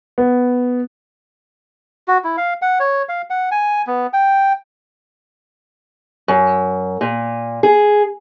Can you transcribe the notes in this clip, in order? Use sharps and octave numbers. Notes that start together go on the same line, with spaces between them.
B3
F#4
E4
F5
F#5
C#5
F5
F#5
G#5
B3
G5
F#2
A#2
G#4